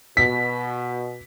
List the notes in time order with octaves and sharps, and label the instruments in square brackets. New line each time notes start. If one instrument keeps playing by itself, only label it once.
[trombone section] B2 [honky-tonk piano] B6